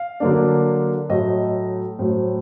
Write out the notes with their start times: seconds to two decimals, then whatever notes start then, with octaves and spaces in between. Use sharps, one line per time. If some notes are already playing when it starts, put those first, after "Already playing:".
Already playing: F5
0.20 D3 F#3 A#3 D4
1.09 A2 F#3 A3 D#5
1.99 A2 F#3 A3 C5